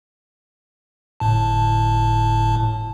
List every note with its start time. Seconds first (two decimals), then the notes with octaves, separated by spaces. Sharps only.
1.20 G1 A2 A5